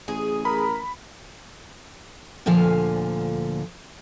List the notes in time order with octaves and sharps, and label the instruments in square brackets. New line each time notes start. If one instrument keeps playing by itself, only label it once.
[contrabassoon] A1 [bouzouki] G#4
[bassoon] A#4 [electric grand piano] B5
[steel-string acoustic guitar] D2 A#2 D3 F3 F5 G#5